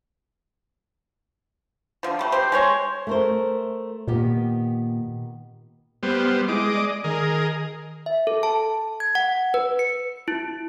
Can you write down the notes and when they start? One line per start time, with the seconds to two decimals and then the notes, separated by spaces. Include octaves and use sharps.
2.03 D3 F3
2.19 G3 A3
2.32 G4 C5
2.52 G#3 C5 C#5
3.07 A3 A#4 C5
4.08 A#2 D#3 B3 G4
6.03 G3 B3 C5 F6
6.48 G#3 E4 D#5 D6
6.76 D5
7.04 D#3 G#4 A#4 D#5
8.06 E5
8.27 A4
8.43 A5
9.00 G#6
9.15 F#5
9.54 B4
9.79 C#7
10.28 E4